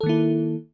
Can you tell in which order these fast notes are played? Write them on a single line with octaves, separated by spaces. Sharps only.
A4 D#3 A#3 E4